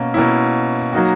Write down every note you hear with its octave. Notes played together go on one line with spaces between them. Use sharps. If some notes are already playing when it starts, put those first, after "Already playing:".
Already playing: B2 A#3 C#4
B2 A#3 C#4 E4
F#3 A#3 D#4 F#4